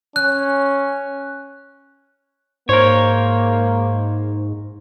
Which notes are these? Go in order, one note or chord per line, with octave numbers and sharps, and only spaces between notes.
C#4 F#6
G#2 A#3 A#4 C5 C#5